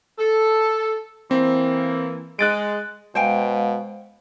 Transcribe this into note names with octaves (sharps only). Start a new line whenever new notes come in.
A4
E3 A#3 C4
G#3 F#6 A6 D7
B2 G#3 C5 F5 G5 G#5